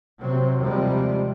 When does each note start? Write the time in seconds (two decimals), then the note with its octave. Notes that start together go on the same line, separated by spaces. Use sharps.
0.20 C3 F#3 C4
0.59 D#2 C3 F3 G3 G#3